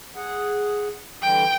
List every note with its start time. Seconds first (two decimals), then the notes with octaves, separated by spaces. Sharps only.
0.16 G#4 F#5
1.22 D3 E3 G3 G5